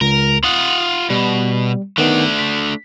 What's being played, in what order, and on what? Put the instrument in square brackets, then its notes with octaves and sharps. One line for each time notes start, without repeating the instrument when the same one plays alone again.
[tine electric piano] C#2 [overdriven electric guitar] A#4
[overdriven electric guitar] F4 F#5 [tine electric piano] D#6
[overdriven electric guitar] B2 [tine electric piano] G3
[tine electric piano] D#3 B3 D#4 [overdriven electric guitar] A3 D4
[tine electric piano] B6